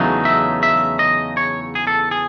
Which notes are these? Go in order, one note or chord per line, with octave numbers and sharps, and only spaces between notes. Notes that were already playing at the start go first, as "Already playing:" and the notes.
Already playing: E2 C#3 F#3 A3 D#4
E5
E5
D#5
C#5
G#4
A4
G#4